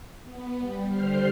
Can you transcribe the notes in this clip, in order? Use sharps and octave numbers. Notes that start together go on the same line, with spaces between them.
B3
G3
D3 G3 C5 C6 F6